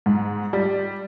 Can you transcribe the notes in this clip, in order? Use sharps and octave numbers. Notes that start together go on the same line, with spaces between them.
G#2
G3